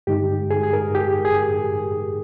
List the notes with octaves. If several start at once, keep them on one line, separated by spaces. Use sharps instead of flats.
G2 D3 G#3 D#4 G4
G#4
G#4
A#4
G4
G#4